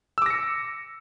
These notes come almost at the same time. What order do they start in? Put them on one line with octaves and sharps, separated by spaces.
E6 D6 A#6 C#7